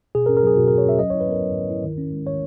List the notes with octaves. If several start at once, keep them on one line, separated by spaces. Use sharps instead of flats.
B2 G#4
A#4
C#4
A#4
F#3 G#4
B2 F#4
B2 A#4
C#5
C#4 E5
F#3 D#5
E4 C#5
B4
B3 A#4
F#3
F#3
E4
D#3
C#4
G#3
D#3 C#5